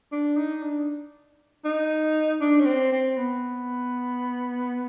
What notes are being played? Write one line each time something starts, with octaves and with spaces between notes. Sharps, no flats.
D4
D#4
D4
D#4
D4
C#4
C4
C4
B3